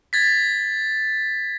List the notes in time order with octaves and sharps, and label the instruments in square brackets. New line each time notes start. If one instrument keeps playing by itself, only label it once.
[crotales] G#6 A6 B6